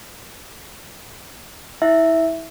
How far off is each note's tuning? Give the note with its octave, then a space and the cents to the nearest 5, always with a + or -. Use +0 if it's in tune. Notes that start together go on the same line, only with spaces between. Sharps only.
E4 -30 E5 +0